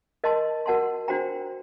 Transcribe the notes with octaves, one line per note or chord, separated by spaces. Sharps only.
A#4 D#5 A5 C6
F#4 A#4 F#5 A5 C6
D4 F#4 C5 G5 A#5